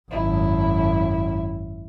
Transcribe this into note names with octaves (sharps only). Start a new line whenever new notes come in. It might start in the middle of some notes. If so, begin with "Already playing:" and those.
G#1 F#2 E4